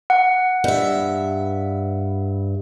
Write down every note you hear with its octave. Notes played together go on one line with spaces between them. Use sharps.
F#5
G2 E5